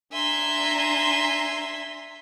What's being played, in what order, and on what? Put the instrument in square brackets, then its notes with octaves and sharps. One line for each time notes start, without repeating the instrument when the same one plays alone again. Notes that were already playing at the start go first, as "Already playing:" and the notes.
[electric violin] D4 A#5 [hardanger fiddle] E5 [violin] G#5 C6